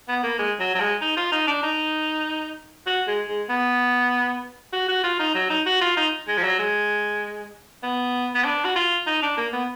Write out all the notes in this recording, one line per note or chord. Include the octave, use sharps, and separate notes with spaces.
B3
A#3
G#3
F#3
F#3
G#3
D#4
F4
D#4
D4
D#4
F#4
G#3
G#3
B3
F#4
F#4
F4
D#4
F#3
D#4
F#4
F4
D#4
G#3
F3
F#3
G#3
B3
B3
D4
F#4
F4
D#4
D4
A#3
B3